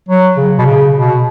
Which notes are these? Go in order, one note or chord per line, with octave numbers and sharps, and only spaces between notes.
F#3
C#3
B2
C#3
B2